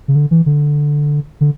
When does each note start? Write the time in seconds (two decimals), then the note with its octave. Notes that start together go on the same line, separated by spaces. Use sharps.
0.08 C#3
0.15 D3
0.31 E3
0.46 D3
1.41 D3